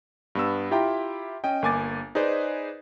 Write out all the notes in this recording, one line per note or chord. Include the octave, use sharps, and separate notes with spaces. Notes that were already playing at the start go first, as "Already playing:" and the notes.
G2 B3 E6
E4 F4 G4 E5 G5 A#5
C#4 D#5 G5
G1 A#3 G#5 D6 A6
D#4 G#4 B4 C5 D5